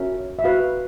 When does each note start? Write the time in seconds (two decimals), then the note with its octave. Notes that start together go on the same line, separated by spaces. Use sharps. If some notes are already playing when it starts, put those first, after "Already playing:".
Already playing: C#4 F#4 A#4 C#5 E5
0.39 E5
0.44 F#4 B4 F5